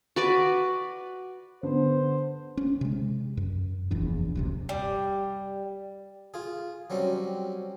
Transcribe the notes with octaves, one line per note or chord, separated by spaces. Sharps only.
F#4 B4 D5
D3 B3 C5
C#4
C3 G#3
F#2
F1 A#1 E2 D4
D1 F#2 C3
G3
F4 G#4
F#3 G3 C4 C#4